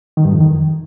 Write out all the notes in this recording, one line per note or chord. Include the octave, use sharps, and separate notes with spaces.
D#3
G2
F2
D#3